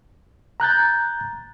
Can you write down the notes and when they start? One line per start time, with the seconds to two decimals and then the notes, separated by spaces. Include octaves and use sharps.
0.60 A#5 F#6 G6 A6